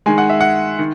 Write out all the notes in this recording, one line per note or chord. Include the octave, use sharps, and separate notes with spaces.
D#3 G#3 G#5
F#5
E5
F#5
D#3